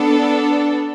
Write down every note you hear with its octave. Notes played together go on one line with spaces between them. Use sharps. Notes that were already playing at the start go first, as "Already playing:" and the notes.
Already playing: B3 D4 A4